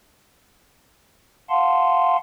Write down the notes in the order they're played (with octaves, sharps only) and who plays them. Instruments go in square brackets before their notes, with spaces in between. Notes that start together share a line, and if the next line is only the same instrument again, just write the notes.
[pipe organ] F5 F#5 A5 C6